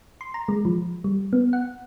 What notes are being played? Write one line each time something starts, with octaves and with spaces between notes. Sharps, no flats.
C6
A#5
G#3
F3
G3
B3
F#5